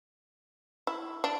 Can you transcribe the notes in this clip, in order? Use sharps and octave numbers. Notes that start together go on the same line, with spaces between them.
E4
D4